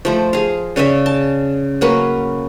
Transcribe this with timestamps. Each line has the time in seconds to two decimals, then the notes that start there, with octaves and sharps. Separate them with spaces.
0.05 F3 A3 C5
0.33 G#4 F5
0.76 C#3 C#4 D5 E5
1.06 A5
1.81 F#3 A#3 C#4 B4